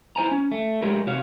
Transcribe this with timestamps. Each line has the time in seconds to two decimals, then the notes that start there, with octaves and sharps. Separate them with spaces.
0.16 E4 C5 G#5 A#5
0.31 C#4
0.52 A3
0.82 F#3 G#3 A3 G4 A#4
1.07 C3 F#4 C#5 F5